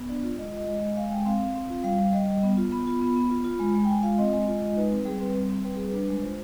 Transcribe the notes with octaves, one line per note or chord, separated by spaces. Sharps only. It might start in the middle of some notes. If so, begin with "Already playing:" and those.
Already playing: B3
D4 D5
F4
G#3 D#5
F4 D#5
G#3
G#3
G#3 F5
G#3 G5
C4 F5
C4
C4
F4
G3 F5
G3
G3 D#5
G3
B3
F4
B3 B5
F4
B3
B3
F4
F4
G#3
G#3
G5
G#3 G#5
F4 F5
C4 D#5
G#3
F4
G#3
D#4 B4
C4
G3 G#4
C4 B4
G3
C4
G3 B4
G3 G#4
D4 B4
G#3
F4 C5